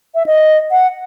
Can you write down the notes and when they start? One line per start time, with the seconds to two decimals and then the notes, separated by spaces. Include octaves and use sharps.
0.15 E5
0.26 D#5
0.71 F#5